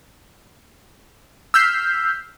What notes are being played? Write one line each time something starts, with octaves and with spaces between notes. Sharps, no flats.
E6 F6 G6 B6 C7